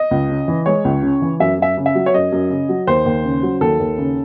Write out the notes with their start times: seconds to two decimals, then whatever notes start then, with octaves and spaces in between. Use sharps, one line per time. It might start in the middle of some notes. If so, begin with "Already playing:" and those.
Already playing: D#5
0.11 C#2
0.29 C#3
0.48 E3
0.66 G#3 C#5
0.85 C#2
1.02 C#3
1.22 E3
1.40 F#2 E5
1.58 F#2 E5
1.77 C#3
1.86 E5
1.95 F#3
2.06 C#5
2.14 F#2 D#5
2.32 F#2
2.50 C#3
2.69 F#3
2.87 D#2 C5
3.06 D#2
3.25 C#3
3.43 F#3
3.61 D#2 A4
3.80 D#2
3.98 C#3